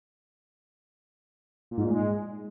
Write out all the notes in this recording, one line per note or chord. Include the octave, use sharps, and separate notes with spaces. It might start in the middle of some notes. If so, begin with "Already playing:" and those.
A#2
G#2
A#2
G#3